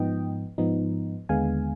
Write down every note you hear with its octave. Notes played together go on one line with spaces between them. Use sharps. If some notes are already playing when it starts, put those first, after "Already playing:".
Already playing: G#2 F3 B3 D#4 D#5 G5
G#2 F3 B3 D#4
D#2 D3 G#3 B3 F5 G#5